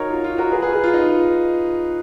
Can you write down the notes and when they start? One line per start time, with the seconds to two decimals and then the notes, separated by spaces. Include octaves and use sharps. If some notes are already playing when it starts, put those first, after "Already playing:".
Already playing: D#4 F#4 A#4 C#5
0.10 F4
0.24 F4
0.38 F#4 A#4
0.51 G#4 B4
0.62 G#4 B4
0.72 G#4 B4
0.83 F4
0.94 D#4
1.08 F4